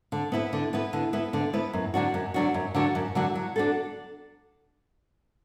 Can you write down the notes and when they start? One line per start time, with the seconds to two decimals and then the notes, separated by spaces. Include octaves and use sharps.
0.12 D3
0.32 B3 E4 B4
0.53 D3
0.73 B3 E4 B4
0.93 D3
1.13 B3 E4 B4
1.33 D3
1.53 B3 E4 B4
1.73 F#2
1.94 D3 F#3 D4 F#4
2.14 F#2
2.34 D3 F#3 D4 F#4
2.54 F#2
2.75 D3 F#3 D4 F#4
2.95 F#2
3.15 D3 F#3 D4 F#4
3.35 F#3
3.56 D4 F#4 A4